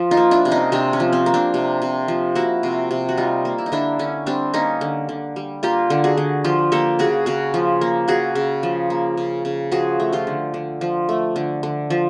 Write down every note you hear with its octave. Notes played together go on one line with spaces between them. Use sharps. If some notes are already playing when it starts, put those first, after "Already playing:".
Already playing: F3
D#4 F4
A#3
D4 E4
C3
C#4 D#4
C3 C4 D4
C#4
F3
C4
A#3
C4 D4
C3
C3
F3
A#3 E4 F#4
C3
C3
F#4
G3 D#4 F4
A#3
E4
D#4
D3 D4 E4
D3 C#4
G3 C4 D4
A#3 C#4 D#4
D3
D3
G3
A#3 F4 G4
D3
F#4 G#4
D3
F3 F4 G4
A#3 G4 A4
C#3 F#4 G#4
C#3 F#4 G#4
F3
A#3
C#3 F#4 G#4
C#3
F3
A#3
C#3
C#3
F3 F#4 G#4
A3
F4 G4
D3
D3
F3
A3
D3
D3
F3